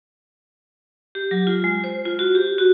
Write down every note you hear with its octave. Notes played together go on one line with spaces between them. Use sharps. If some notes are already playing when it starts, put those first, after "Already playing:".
G4
F#3
F4
G#3
C5
F4
F#4
G4
F#4